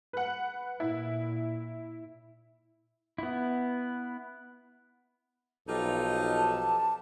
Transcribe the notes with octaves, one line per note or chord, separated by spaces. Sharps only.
B4 F#5
A#2 E4
B3 E4
B1 F3 D#4 F4 G4 A4
A5